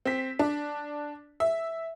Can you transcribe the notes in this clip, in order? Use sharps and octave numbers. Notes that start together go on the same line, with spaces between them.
C4 B6
D4
E5